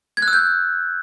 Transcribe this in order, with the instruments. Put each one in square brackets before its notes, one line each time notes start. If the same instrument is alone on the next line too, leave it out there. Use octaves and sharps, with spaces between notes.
[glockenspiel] G#6
F#6
E6
G6